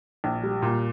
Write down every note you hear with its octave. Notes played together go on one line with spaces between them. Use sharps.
A#1
G3
A#2